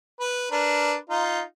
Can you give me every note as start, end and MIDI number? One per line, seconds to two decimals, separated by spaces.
0.20 0.47 71
0.51 0.95 62
0.51 0.95 70
0.51 0.95 71
1.10 1.41 63
1.10 1.41 65